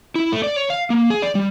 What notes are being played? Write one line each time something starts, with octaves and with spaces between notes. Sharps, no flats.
E4
A3
D5
C#5
F5
A#3
G#4
D5
G3